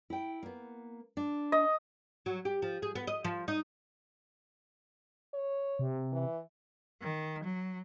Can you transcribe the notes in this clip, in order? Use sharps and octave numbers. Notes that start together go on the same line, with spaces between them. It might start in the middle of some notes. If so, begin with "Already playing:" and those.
E4 G5
A#3 B3
D4
D#5
F#3
G4
F3
G#4
B3
D#5
F3
D#4
C#5
C3
E3
D#3
F#3